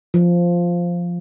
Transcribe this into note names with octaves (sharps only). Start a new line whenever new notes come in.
F3